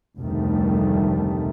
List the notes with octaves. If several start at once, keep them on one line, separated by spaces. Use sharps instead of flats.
F1 D2 C3 D#3 G3 A3